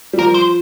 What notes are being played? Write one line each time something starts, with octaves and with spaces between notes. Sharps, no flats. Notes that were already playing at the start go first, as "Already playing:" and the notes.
G3
F3 A#4
C5